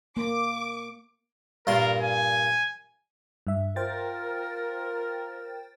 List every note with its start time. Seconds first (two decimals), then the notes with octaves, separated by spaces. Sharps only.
0.17 A#3 D6
1.67 G2 A#2 A#4 C6
2.02 G#5
3.47 G2 E5
3.76 F4 A#4 C5 G5 A6